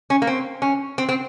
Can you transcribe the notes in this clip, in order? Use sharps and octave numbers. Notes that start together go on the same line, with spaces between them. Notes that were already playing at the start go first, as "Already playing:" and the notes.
C#4
A#3
C4
C#4
C4
C4